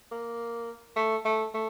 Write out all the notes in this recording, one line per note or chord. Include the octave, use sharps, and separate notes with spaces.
A#3
A3
A3
A3